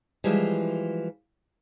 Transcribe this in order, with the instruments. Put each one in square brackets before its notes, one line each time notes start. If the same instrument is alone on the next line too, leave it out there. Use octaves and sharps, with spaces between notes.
[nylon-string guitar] E3 F3 G3 G#3